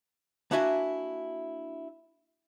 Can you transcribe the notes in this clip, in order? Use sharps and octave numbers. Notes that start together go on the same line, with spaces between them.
A#3 D4 E4 F#4 E5 G#5